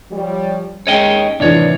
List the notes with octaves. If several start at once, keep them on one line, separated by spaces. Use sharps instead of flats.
F3 G3 C#5
D#2 G#3 C#4 C#5 D#5 G5
C2 A2 D#3 E3 D4 C#5